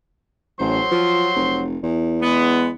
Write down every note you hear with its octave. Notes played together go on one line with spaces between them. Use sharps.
A1 F#3 C5 C6
F3
F1
E2
G#3 B3